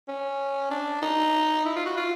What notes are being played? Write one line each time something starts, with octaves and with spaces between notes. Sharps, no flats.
C#4
D4
D#4
E4
F4
F#4
F4